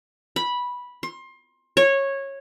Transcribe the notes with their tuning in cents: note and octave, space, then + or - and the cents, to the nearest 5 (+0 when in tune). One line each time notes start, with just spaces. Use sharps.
B5 -10
C6 +25
C#5 -15